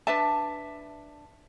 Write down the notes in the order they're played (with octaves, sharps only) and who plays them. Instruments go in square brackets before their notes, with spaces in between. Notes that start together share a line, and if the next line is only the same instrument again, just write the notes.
[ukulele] D4 B4 E5 A5